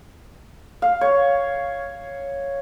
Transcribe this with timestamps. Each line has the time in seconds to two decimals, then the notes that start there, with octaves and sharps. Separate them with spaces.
0.82 F5
1.01 C#5